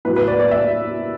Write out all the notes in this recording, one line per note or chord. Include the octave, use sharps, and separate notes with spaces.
A2 F#3 B4
B4
D5
D5
E5